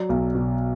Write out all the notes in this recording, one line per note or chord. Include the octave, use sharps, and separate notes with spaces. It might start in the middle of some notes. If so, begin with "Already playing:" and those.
Already playing: F#3 D5
B1
B2